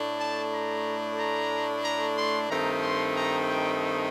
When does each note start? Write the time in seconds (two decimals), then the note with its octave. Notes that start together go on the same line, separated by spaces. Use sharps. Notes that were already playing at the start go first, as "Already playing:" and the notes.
Already playing: A2 A3 D4
0.20 A5
0.53 A#5
1.19 A#5
1.84 A#5
2.17 C6
2.50 G2 D#3 A3 C4 D#4 A#5
2.82 C6
3.16 A#5
3.49 G5